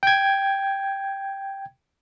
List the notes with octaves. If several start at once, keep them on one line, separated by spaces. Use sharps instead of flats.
G5 G#6